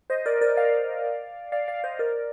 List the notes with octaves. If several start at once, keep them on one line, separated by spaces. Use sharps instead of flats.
C5 D#5
A#4 D5
A#4 D5
D5 F5
D5 F5
D5 F5
C5 D#5
A#4 D5